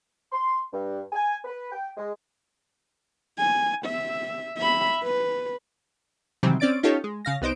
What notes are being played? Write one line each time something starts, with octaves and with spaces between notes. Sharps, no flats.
C6
G2
G#5
B4
G5
G#3
G#5
E5
E5 B5
B4
C3 D#3 E3 F#3 G3 C4
C4 C#4 D5 A6 D7
C#4 D#4 F4 G4 A4 C#5
G#3
C#3 F5 A#6
C2 B3 D#4 C5 D7